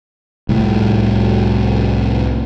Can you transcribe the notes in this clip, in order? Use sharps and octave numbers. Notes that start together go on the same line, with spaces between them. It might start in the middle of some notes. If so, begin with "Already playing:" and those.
C2 A2